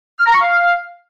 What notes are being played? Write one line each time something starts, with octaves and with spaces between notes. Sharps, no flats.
F6
A#5
C#6
F5